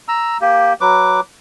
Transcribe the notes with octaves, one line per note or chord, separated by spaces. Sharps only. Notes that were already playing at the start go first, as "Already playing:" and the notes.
A#5 E6
A#3 G4
F#3 B4 D6